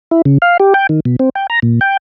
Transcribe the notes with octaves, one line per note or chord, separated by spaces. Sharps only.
E4
C#3
F5
G4
G5
D#3
B2
C4
G5
A#5
A#2
G5